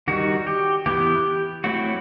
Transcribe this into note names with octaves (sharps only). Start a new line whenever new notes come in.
D#3 G3 D#4 F#4
G4
E3 B3 E4 G4
F#3 A3 C4 E4 F#4